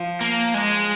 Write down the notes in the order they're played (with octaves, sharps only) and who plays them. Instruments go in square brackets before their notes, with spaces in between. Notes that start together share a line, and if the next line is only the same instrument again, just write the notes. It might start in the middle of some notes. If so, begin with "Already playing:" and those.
Already playing: [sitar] F3
[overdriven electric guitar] A#3
G#3